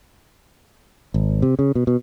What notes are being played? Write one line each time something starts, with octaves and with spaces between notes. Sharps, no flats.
G#1
C3
C#3
B2
B2